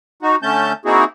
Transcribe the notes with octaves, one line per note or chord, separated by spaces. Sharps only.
D#4 F#4
D3 A3 C#4 A5 G6
A#3 C4 D#4 E4 F#4 G#4